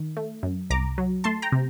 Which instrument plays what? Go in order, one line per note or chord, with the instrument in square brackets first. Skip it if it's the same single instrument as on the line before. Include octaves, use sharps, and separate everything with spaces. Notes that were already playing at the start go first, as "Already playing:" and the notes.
Already playing: [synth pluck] D#3
A3
F#2
C2 A#5 D6
F#3
A3 A5 C6
G5 A#5
C3